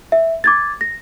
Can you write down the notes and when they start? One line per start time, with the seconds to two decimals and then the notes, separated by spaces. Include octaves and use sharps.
0.12 E5
0.44 D6 G#6 A6
0.81 A#6